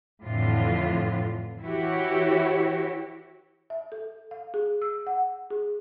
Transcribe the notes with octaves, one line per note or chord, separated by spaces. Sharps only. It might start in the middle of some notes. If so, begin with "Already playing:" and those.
F2 A2 D3 E3 F4
E3 E4 F#4 G4 C#5
E5
A4
F5
G#4
E6
F#5
G#4